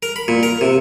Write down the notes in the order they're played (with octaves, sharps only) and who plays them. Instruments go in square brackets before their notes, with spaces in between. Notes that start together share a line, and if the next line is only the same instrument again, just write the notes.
[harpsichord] A#4
B5
A#2
A#4
C3